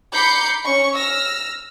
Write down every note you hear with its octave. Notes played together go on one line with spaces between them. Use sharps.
A#5 B5 D6 G6 C7 C#7
C#4 C#6
E6 F6 A#6